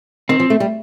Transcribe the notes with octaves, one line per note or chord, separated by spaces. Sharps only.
D#3 C4
F3
A3
G3